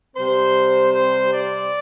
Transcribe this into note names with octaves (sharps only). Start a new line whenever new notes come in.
C3 G3 C4 C5
C5
D5